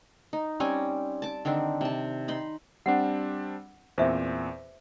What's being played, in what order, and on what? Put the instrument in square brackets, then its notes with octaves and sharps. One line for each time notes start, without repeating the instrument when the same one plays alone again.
[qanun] D#4
G3 C4 C#4 G#5
A5 D6
D3 D#3 C4 D4
C3 A5
D#4 B5 C6
[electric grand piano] G3 C4 D4 [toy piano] F#5
[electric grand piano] E2 A#2 C4 [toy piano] C5 E5